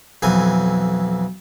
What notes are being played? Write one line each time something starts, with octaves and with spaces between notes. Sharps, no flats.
B1 F2 E3 G#5